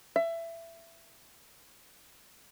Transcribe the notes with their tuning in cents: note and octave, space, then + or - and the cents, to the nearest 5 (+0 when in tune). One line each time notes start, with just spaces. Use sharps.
E5 +20